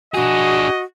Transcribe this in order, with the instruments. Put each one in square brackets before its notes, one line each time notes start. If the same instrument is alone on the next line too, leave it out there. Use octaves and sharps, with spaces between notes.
[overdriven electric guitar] D4 G#4 [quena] F#4 [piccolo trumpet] D#5